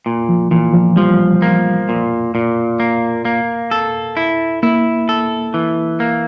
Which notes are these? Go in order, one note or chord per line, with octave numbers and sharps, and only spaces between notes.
A#2
F3
A#2 E3
F3
F3 G3
A#3
A#2
A#2
A#3
A#3
A4
E4
A#3 E4
A4
E3
A#3